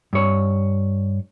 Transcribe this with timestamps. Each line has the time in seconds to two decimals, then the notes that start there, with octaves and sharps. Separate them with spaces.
0.13 G2 C#5